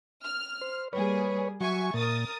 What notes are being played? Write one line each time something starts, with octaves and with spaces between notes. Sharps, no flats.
F6
C5
G3 A#3 G#4 B4 C#5
F#3 E5 G#5 C#6
A#2 A#4 D#6 A6